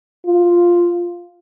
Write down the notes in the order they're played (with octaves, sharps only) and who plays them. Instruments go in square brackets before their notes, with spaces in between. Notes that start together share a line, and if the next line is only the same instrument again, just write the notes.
[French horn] F4